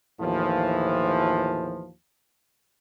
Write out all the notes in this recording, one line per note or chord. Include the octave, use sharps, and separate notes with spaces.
D#2 A2 E3 F3